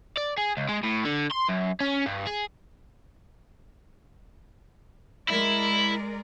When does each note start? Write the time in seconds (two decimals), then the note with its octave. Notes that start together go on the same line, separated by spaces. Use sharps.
0.17 D5
0.37 G#4
0.57 C#2
0.69 G#3
0.83 A2
1.05 D3
1.31 C6
1.49 F#2
1.80 C#4
2.06 G2
2.27 G#4
5.29 G#3 E4 A#4 D5 E5